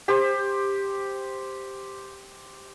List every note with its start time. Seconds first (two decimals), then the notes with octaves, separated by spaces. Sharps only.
0.08 G4 C5